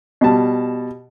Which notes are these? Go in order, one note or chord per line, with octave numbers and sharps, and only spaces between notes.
B2 G3 A5